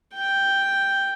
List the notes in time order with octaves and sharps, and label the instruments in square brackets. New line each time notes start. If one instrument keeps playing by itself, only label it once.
[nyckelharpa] G5